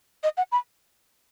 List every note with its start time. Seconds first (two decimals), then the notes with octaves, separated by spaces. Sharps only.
0.23 D#5
0.37 F#5
0.52 B5